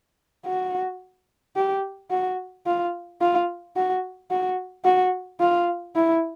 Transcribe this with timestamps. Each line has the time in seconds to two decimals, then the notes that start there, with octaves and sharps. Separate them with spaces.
0.46 F#4
1.56 G4
2.11 F#4
2.66 F4
3.21 F4
3.76 F#4
4.30 F#4
4.85 F#4
5.40 F4
5.96 E4